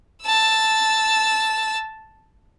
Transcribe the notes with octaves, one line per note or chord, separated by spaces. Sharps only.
A5 E6